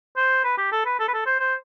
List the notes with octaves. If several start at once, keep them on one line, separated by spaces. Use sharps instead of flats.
C5
B4
G4
A4
B4
A4
B4
A4
C5
C5